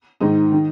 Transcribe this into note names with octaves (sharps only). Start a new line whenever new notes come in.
G#2 D#3 D#4
D#3